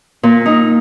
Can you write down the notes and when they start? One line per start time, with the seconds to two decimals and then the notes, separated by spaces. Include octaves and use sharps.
0.23 A#2
0.46 D#4